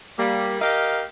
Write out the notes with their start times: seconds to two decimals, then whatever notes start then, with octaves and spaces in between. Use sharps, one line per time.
0.18 G3 A#3
0.61 G4 A#4 D#5 F5